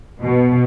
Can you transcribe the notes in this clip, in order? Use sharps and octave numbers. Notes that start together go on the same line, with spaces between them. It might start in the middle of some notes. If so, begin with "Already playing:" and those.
B2